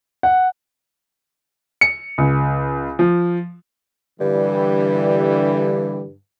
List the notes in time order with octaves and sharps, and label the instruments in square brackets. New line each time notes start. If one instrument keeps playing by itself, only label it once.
[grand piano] F#5
C#7
C#2
F3
[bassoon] G2 [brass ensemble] D3 E3 G3